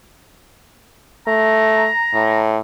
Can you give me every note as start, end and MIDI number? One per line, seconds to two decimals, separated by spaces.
1.27 1.88 57
1.27 2.42 82
2.14 2.59 45